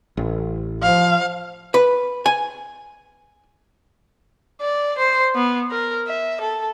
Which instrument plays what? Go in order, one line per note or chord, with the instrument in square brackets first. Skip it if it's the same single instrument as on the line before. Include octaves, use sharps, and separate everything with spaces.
[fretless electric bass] A1
[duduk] F3 [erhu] F5
[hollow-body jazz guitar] B4
G#5
[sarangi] D5
C5
B3
A#4
E5
A4